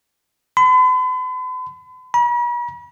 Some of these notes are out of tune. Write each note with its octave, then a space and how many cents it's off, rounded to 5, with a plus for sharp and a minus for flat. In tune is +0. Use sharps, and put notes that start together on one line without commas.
B5 +45
B5 -45